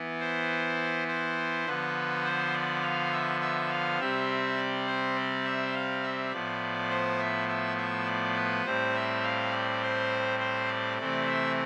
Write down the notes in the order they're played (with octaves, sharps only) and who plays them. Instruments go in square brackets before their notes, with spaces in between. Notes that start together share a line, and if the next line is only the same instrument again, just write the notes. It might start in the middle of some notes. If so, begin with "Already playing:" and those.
Already playing: [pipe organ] E3 B3
C5
C5
D3 F3 B3 B4
C5
D5
F5
E5
E5
F5
C3 G3 C4 E5
D5
C5
D5
E5
F5
E5
A2 F3 B3 D5
C5
E5
E5
E5
D5
B4
A2 G3 C4 C5
E5
F5
D5
C5
C5
D5
C3 E3 A3 C4 D5
E5